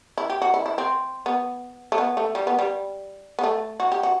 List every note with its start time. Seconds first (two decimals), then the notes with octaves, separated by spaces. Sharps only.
0.18 E4
0.30 G4
0.42 F#4
0.54 E4
0.66 E4
0.78 C4
1.26 B3
1.92 A3
1.98 B3
2.17 A3
2.35 G3
2.47 B3
2.59 G3
3.39 B3
3.44 A3
3.80 F#4
3.92 G4
4.03 F#4